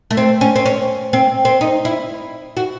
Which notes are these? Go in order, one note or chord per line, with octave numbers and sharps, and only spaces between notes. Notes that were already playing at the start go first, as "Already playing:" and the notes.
A3
C4
C#4
C4
C#4
C4
C4
D#4
E4
F#4